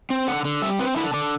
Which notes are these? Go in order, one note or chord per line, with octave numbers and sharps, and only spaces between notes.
C4
D3 F#5
D3
G3 E5
C4 B4
D3 E4
D3 D4